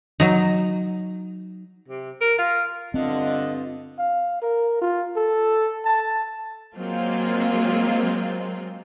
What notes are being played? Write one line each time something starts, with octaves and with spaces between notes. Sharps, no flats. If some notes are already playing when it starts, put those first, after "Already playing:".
F#3 D#4
C3
A#4
F4
G2 D3 C4 F4 D#5
F5
A#4
F4
A4
A5
F#3 G#3 A#3 C4 F4